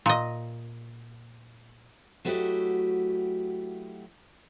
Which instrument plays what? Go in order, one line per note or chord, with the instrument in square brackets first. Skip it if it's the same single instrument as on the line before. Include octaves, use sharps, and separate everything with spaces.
[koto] A#2 D#5
[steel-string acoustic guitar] F#3 A3 E4 F#4 G4 D#5